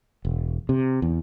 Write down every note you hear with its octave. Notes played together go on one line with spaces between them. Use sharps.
E1
C3
E2